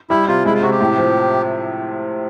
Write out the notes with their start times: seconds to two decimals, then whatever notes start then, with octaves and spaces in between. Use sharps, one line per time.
0.10 G3 E4
0.28 C3 F4
0.45 G#3 E4
0.55 F4
0.62 C3 F#4
0.71 G4
0.81 A2
0.98 F3